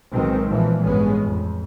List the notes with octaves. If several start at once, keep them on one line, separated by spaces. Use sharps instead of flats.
B1 B2 D#3 G#3 C4
A#2 E3 F3
A1 G2 G#3 B3 C#4
F2